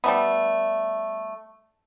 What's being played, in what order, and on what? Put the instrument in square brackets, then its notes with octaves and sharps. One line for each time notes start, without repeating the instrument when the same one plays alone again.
[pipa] G3 A3 B3